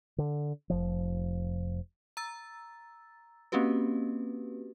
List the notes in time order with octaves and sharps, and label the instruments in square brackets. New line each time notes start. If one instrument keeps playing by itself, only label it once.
[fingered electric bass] D3
F1 F3
[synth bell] A#5 E6 A6
A#3 C4 C#4 F#4 G4 B4